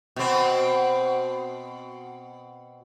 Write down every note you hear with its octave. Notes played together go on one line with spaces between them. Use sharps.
B2 C4